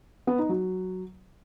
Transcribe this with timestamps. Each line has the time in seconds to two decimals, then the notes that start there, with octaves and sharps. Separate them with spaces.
0.27 B3
0.38 D#4
0.49 F#3